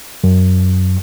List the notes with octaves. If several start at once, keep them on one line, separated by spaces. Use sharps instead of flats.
F#2